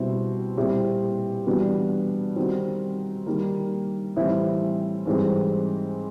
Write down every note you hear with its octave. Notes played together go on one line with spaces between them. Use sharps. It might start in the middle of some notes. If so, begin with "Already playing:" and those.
Already playing: B2 G3 C4 E4
A#2 G3 C4 E4 G4
E3 G3 B3 D4 F#4
D#3 G3 C4 D#4 F#4
D#3 G3 A#3
A2 E3 G3 C4 E4
G#2 E3 G3 C4